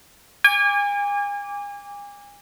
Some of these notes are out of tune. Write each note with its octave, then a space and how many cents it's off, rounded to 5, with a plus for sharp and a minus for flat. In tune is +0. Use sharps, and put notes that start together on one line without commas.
G#5 -35 D6 -10